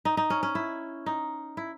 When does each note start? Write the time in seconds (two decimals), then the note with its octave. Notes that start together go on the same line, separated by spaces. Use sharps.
0.05 D#4
0.17 D#4
0.30 C#4
0.43 C#4
0.55 E4
1.06 D#4
1.57 E4